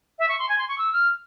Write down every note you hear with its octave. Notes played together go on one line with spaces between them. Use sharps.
E5
C#6
C6
G#5
C6
C#6
E6
F6